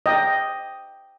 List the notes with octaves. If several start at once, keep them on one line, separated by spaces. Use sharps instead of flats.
D#5 G5